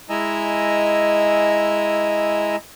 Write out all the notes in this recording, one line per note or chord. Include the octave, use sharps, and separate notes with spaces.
G#3 E4 D#5 G#5 A#5 E6